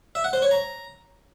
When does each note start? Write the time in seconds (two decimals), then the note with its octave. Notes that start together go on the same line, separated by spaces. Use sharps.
0.15 E5
0.24 F#5
0.33 C5
0.42 C#5
0.51 A#5